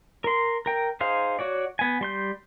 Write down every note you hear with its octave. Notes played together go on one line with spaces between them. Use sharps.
A#4 C6
A#4 G5
D#4 G#4 C5 F5
F#4 C#5 D5
B3 G#5
G3 C6 G6